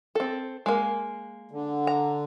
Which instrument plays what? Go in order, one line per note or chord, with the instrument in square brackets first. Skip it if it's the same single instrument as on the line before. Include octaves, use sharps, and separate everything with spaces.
[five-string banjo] C4 A4
G#3 A#3
[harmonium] D3
[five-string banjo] A#5